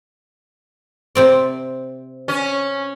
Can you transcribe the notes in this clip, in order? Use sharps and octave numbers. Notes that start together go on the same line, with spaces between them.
C3 C4 D5
C#4